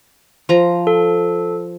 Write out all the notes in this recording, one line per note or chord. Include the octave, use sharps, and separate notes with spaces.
F3 A#5
A4